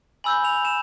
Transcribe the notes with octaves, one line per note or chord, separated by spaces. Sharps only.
G#5 B5 E6 G6 F#7
F7
E7